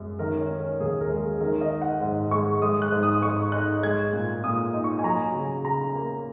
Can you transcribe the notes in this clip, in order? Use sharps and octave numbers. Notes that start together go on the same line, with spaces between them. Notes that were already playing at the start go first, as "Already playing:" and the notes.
Already playing: F#2 G#3
D#3 A#4
C#5
C#4
A#4
D#2 G#4
A#4
G#3
G#4
D#3 A#4
D#5
D#4
F#5
G#2
G#3 C#6
G#3 D#6
F#6
G#2
D#6
G#2 C#6
D#4 F#6
G#3 G#6
A#2
A#2 D#6
D#4
C#6
G#5
F#3 A#5
C#3
C#3 A#5
A#3